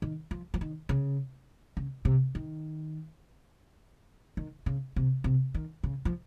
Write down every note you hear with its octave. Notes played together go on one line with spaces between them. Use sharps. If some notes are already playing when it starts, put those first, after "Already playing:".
D#3
F3
F3
D#3
C#3
C#3
C3
D#3
D#3
C#3
C3
C3
D#3
C#3
F3